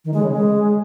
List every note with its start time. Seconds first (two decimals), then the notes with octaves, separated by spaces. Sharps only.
0.05 D#3
0.14 G#3
0.23 C#3
0.32 G#3